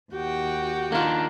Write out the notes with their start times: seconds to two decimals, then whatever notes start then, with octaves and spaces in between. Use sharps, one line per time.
0.13 D#2 F#4 G4 G5
0.92 D#3 A#3 D4 F4